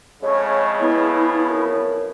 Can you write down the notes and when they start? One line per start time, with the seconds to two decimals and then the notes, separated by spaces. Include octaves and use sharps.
0.23 F2 A2 C#3 G#3 C#5
0.80 B3 E4
1.49 F#2